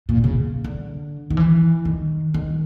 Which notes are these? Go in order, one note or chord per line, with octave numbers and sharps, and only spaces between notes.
A#2
C#3
D3
D#3
E3
D#3
D#3